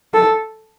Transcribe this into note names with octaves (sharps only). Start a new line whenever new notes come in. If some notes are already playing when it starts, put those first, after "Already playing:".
A4